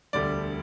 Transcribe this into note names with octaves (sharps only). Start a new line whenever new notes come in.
E1 D2 D3 G3 D5